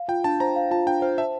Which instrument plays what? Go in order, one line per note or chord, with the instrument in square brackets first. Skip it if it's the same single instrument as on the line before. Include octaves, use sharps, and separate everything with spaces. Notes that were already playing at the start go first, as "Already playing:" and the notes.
Already playing: [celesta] F5
[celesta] F4 [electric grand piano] G5
[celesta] D4 [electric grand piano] A5
[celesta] C5 [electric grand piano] A#5
[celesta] F5
[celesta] F4 [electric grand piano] A5
[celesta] D4 [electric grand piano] G5
[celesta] C5 [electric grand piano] F5
[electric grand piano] E5 [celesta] A5